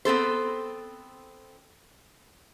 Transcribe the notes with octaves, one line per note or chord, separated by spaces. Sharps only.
B3 C4 A4 C5